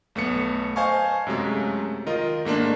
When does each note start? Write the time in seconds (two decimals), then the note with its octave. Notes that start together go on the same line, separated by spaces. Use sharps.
0.15 B1 A3 B3 C#7
0.76 C5 D#5 F5 G#5 A5 C#6
1.27 F#2 C3 F#3 G#3 A3
2.06 D#3 F4 A#4 D#5
2.45 G#2 A3 A#3 D4